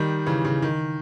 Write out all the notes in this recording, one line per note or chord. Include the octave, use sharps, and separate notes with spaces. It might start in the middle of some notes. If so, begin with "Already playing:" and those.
Already playing: D#3 G3
C#3 E3
C#3
D#3